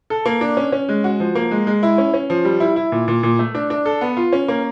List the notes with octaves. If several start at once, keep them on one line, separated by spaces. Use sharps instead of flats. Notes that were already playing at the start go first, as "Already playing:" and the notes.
A4
A#3
D4
C#4
C#4
G#3
F#4
F3
A#3
G#3
G#3
E4
C#4
C#4
F3
G3
E4
E4
A#2
A#2
A#2
A3
D4
D4
A4
B3
F4
C#4
A#3